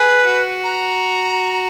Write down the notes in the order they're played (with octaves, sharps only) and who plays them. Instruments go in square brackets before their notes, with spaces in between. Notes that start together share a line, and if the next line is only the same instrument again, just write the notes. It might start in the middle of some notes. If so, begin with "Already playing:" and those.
Already playing: [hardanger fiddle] G#4 [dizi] B4
[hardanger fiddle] F#4
[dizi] A#5